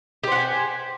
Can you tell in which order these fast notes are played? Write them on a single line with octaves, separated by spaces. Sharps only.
G4 C5 F#5 G#5